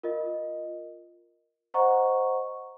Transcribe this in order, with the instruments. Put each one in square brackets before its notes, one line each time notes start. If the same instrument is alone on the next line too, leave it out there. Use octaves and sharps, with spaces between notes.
[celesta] F4 A#4 D#5
C5 D#5 F#5 A#5 C#6